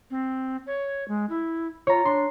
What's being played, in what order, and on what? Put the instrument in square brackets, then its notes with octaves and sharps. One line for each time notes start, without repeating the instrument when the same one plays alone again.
[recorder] C4
C#5
G#3
E4
[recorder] F4 [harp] C#5 A#5
[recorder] D4 [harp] C6